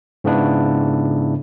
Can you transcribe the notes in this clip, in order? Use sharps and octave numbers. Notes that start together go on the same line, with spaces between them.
G#2 C#3 B3 D4 E4